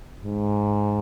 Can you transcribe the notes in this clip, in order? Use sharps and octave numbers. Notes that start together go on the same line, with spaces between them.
G#2